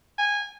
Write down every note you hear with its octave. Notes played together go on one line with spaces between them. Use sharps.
G#5